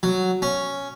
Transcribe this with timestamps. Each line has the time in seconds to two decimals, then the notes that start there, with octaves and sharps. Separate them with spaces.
0.03 F#3
0.42 C#4